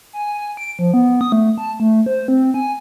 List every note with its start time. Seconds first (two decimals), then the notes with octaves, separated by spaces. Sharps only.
0.13 G#5
0.38 G#5
0.57 D7
0.79 F3
0.94 B3
1.21 D#6
1.32 A3
1.58 A5
1.80 A3
2.06 C5
2.28 C4
2.54 G#5